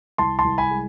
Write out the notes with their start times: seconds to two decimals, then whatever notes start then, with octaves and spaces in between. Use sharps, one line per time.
0.18 C2 A5 C6
0.39 A5 C6
0.44 C2
0.58 G#5 B5
0.71 G#3